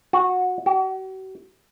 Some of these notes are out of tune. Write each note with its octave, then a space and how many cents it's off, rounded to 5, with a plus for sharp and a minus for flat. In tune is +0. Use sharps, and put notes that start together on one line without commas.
F#4 -15
F#4 +45